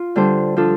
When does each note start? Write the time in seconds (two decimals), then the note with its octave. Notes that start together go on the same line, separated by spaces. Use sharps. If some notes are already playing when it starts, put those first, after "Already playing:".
Already playing: F4
0.16 D3 G3 D4 A4 C5
0.57 F3 D4 F4 A4